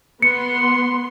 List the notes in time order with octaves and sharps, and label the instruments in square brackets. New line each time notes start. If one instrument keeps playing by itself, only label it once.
[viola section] B3 C6 [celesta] C#7